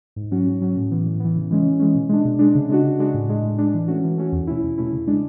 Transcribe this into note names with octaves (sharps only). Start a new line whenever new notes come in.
G#2
F#3 C#4 F#4
G#2
F#3 C#4 F#4
A2
E3 B3
A2
E3 B3
C#3
E3 G#3 C#4
C#3
E3 G#3 C#4
B2
G#3 D4
B2
G#3 D4
C#3
G#3 D4 F#4
C#3
G#3 D4 F#4
A2
G#3 D4
A2
G#3 D4
E3
A3 C#4 F#4
E3
A3 C#4 F#4
E2
B2 A3 C#4 E4
E2
B2 A3 C#4 E4
C#3
G#3 D4